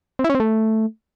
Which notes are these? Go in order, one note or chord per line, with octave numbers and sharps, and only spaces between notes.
C4
E4
C#4
C4
A3